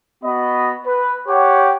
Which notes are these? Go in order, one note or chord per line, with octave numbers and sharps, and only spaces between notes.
B3 F#4 D#5 B5
B4
G4 C#5 F#5 G5